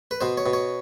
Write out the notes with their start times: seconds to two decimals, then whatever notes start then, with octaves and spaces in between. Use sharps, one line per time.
0.11 B4
0.21 B2 C5
0.38 C#5
0.46 B2
0.53 C#5